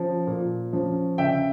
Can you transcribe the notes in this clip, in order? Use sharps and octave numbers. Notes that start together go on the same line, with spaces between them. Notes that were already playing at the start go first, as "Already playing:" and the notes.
Already playing: F3 C#4
A#2
F3 C#4
C#3 E5 G5